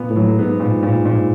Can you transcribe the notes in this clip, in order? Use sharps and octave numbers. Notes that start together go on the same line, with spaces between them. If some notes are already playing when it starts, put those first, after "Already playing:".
Already playing: A#2 B3
A2
F#3
G#2 B3
A#2
A#2
A#2